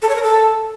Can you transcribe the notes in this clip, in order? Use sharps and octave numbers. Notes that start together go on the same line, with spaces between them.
A4
C#5
A#4
A4